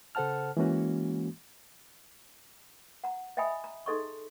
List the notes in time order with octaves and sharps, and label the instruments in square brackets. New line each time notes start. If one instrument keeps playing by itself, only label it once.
[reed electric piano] C#3 A4 C5 F#5 A5 F6
E3 G#3 A#3 C#4 F#4
[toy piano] F#5 A#5
D#5 E5 G5 G#5 B5 D#6
A#5
D#4 G#4 A4 D#5 C6 C#6